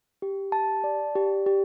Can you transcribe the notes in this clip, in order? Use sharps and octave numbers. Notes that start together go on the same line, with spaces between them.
G4
A5
D5
G4
G4